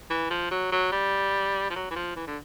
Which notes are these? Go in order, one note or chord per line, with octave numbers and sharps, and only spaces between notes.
E3
F3
F#3
F#3
G3
F3
F#3
E3
F3
E3
D3